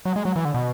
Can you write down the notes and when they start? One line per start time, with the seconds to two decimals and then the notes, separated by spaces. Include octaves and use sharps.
0.05 F#3
0.16 G#3
0.25 F#3
0.36 E3
0.45 D3
0.54 B2